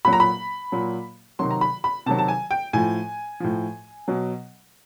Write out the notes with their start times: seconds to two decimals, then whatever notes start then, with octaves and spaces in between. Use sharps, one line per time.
0.05 A#2 F#3 B5
0.13 A#5
0.20 B5
0.72 A#2 F#3
1.39 C3 D#3 F#3 C6
1.51 A#5
1.61 B5
1.84 B5
2.06 C3 D#3 F#3 A5
2.18 A5
2.28 G#5
2.51 G5
2.73 A2 F3 G#5
3.40 A2 F3
4.08 B2 F#3